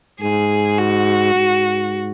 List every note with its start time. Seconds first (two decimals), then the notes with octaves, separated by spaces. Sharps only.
0.21 G#2 G#4
0.78 F#4
1.35 G#2